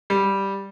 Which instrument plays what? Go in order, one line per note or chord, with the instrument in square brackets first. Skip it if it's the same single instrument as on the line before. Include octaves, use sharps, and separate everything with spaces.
[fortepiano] G3